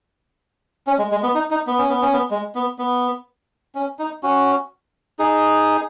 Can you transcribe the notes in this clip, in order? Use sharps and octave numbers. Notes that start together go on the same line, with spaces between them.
C#4
G#3
G#3
B3
D#4
D#4
B3
C#4
B3
C#4
B3
G#3
B3
B3
C#4
D#4
C#4 F#4
D#4 G#4